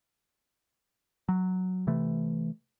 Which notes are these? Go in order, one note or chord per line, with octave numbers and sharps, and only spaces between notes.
F#3
C3 E3 A3